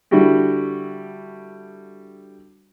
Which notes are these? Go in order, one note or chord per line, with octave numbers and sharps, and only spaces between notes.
D3 G3 E4 F#4 G4